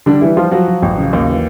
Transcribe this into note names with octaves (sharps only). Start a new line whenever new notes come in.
D3 G3 D4
E3 G3 E4
F3 G3 F4
F3 F#3 F#4
F3
A1
C#3
D#2
E3